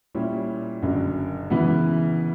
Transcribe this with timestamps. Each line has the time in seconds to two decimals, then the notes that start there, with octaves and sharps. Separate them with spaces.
0.15 A#2 G3 C#4 E4
0.82 F#1 F#2 D3 F#3
1.50 C#3 E3 B3 E4